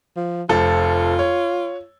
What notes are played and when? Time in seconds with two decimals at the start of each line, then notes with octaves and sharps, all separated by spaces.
0.16 F3
0.49 F1 F3 F4 A4
1.19 C#5